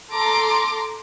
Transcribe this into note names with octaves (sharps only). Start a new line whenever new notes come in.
A4 A#5 C6 D6